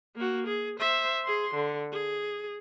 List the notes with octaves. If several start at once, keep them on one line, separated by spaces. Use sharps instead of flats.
A#3 F#4
G#4
C5 E5
G#4 C6
D3
G#4